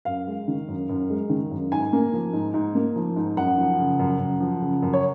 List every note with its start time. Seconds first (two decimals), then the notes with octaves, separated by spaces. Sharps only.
0.05 F#2 F5
0.27 G#3
0.48 D#3
0.68 F#2
0.89 F#2
1.10 G#3
1.30 D#3
1.51 F#2
1.72 G#2 G#5
1.93 A#3
2.13 F3
2.33 G#2
2.54 G#2
2.75 A#3
2.96 F3
3.16 G#2
3.37 F#2 F#5
3.58 F3
3.79 C#3
3.99 F#2
4.19 F#2
4.40 F3
4.61 C#3
4.82 F#2
4.93 C#5